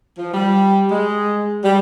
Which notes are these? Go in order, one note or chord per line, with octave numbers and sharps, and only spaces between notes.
F3
G3
G#3
G3